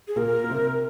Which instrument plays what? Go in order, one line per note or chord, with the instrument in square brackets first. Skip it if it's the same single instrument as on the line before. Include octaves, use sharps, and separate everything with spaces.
[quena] G#4
[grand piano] A#2 A#3 [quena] A#4
[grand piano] A#3
C3 C4